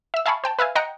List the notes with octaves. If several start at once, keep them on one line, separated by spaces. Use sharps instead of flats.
E5 E6
E5 F5 G#5 A5 B5 C#6
C5 G5 A5
B4 E5 F5 G#5
D#5 F#5 G5 A#5 C#7